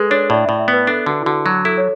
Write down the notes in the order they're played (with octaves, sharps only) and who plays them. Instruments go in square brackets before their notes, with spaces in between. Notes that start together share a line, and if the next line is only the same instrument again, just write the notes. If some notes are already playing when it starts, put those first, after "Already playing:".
Already playing: [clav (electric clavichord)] G#3 [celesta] G#4 A4 B4
[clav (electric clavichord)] D4 [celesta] C#5
[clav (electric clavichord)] A2 [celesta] D5
[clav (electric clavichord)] A2 [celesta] E5
[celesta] E5
[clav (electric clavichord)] B3
[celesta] B4
[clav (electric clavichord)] D4 [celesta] A4
[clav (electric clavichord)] D3 [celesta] F#4
[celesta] E4
[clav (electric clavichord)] D3 [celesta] F#4
[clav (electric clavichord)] F#3
[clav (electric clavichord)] E4 [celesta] A4
[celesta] C#5